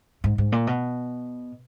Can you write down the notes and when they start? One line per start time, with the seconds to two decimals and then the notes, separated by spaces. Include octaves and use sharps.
0.24 G#2
0.38 G#2
0.52 A#2
0.67 B2